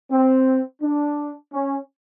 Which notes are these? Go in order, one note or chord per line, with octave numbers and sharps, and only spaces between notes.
C4
D4
C#4